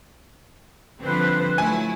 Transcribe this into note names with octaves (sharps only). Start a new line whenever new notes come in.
D3 F3 G3 C4 B4 C5
F3 F#3 A3 E4 G#5